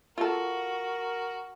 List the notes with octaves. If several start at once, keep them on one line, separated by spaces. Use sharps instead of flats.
F4 F#4 A4 A#4